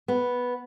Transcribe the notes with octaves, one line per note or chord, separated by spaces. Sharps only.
B3